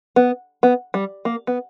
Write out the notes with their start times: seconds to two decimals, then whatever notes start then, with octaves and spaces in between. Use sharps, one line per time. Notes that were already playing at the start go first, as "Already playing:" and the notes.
0.16 B3
0.63 B3
0.94 G3
1.25 A#3
1.47 B3